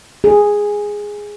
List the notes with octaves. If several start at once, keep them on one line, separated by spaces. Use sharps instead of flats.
G#4